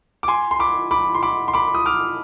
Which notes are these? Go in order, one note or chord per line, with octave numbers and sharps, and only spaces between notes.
D6
G#5 C6
C6
B5 D6
B5 D6
C6
B5 D6
C6
B5 D6
D#6
D6 F6